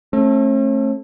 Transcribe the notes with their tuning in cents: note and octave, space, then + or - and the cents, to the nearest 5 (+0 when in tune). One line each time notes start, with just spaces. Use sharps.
A3 +0 C#4 -45